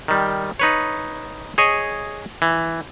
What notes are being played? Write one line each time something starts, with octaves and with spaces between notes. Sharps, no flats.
D#3 G3
D#4 B4 C#5
G#4 C#5 D#5
E3